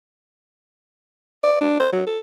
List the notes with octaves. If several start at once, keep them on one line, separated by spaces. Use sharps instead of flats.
D5
D4
C5
F#3
A4